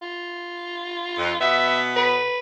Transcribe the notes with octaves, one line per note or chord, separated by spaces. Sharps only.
F4
F2
B2 B3 E5
B4